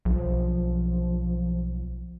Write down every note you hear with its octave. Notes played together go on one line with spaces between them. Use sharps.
B1 F3